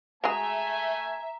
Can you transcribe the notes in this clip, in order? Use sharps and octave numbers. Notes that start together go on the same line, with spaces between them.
G#3 A3 F#4 G#4 E5 G#5 A#5